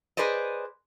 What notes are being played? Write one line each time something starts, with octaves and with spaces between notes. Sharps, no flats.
G#4 B4 C5 D5 D#5